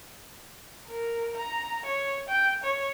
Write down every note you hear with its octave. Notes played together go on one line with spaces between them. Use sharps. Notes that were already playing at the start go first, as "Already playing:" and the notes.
A#4
A#5
C#5
G5
C#5